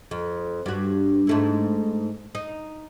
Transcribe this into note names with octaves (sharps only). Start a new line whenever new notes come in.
F2
G2 F#4
G#2 A3 E4
D#4